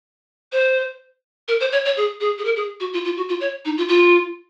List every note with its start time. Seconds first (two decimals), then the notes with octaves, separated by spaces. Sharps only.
0.52 C5
1.48 A#4
1.60 C5
1.72 C#5
1.85 C#5
1.97 G#4
2.21 G#4
2.38 G#4
2.45 A#4
2.56 G#4
2.80 F#4
2.93 F4
3.05 F4
3.17 F#4
3.29 F4
3.40 C#5
3.65 D#4
3.77 F4
3.88 F4